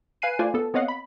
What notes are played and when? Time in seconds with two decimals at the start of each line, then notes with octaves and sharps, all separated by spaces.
0.22 B4 F5 G#5 F#6 C7 D#7
0.39 A3 F4 C5 D5 F5 G#5
0.54 B3 A4
0.74 B3 C4 C#5 D#5 F5 F#5
0.88 B5